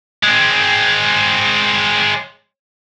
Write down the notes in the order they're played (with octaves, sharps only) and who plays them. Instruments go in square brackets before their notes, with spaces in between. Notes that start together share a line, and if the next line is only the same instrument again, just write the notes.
[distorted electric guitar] G#3 C4